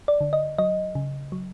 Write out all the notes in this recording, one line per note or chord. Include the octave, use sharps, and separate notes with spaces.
D5
D3
D#5
F#3 D#5
C#3
F#3